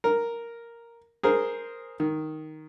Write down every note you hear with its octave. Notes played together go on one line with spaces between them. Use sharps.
A#4
G#4 A#4 C5
D#3